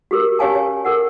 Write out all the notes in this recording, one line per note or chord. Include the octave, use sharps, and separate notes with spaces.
F#4 G4 A4 A#4
C#4 G4 C#5 F5 G#5 A5
C#5
A4 A#4 F#5